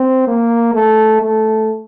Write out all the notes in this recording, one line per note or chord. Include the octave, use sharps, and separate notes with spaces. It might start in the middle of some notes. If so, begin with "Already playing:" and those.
Already playing: C4
A#3
A3
A3